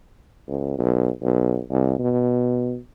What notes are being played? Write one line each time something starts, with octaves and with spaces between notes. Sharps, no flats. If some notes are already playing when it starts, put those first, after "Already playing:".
C#2
B1
B1
C2
B2